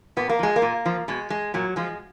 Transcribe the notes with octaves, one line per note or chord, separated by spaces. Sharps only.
A#2 B3
A#3
F3 G#3
A#3
A#2
F3
B2 G#3
G#3
A#2 F#3
F3 G#3